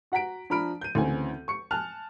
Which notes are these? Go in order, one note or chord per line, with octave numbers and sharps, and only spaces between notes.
F#4 F#5 A#5 B6 D7
F3 D4 A#5 B5 F6 D7
G6 D#7
D2 C#3 E3 C4 G#5
C#6 C#7
G#5 A5 F6 F#6 F7